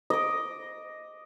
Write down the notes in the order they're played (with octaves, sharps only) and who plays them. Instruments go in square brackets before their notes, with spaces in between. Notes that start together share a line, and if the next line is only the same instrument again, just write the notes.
[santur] D#5 D6